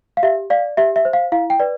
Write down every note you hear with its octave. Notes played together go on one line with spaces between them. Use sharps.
F5
G4 E5
D5 F5
G4 E5
E5
C5
F5
E4 F5
G5
B4 D5